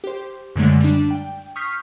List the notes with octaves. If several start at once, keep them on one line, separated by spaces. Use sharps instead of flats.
G4 C5
F#2 D3 D#3 F#3 G#3 A3
G3 D4
G5
C#6 D#6 F6 G6 B6 C7